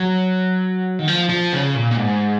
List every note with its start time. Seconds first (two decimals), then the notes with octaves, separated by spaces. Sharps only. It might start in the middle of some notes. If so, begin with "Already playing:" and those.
Already playing: F#3
0.99 D#3
1.07 F3
1.29 F3
1.53 C#3
1.75 A#2
1.92 A#2
1.97 G#2